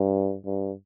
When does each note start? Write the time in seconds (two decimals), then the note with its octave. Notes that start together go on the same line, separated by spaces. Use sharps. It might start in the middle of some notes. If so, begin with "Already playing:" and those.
Already playing: G2
0.46 G2